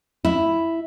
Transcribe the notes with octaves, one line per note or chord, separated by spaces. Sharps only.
E4